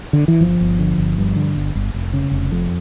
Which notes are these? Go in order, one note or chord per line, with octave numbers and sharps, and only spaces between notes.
D3
E3
G1 F3
G1
D3
G1
G2
D3
G1
G1
F1
C#3
F1
F2